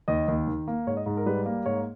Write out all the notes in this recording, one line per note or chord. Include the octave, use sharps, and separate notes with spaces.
D#2 D#5
D#2
D#3
A#3
G#2 C#5
D#5
G#2
A#4
G3 B4
A#3
G#2 C#5